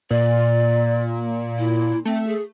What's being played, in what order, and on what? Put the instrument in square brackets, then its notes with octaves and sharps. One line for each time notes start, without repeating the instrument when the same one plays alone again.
[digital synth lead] A#2 [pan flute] D5
[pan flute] E4
[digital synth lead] A3 [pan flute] C4
[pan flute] G#4